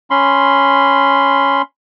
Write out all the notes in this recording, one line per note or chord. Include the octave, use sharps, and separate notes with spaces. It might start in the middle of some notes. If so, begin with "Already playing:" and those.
C#4 B5 C6